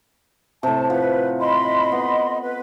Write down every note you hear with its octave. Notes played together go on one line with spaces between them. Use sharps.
A2 C3 A5
F3 B4 F#5
D#5 B5 C6
B3
B4